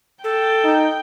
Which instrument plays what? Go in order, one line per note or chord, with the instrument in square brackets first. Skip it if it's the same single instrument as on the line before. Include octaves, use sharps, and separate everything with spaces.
[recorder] A4 [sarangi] G5
[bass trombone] D#4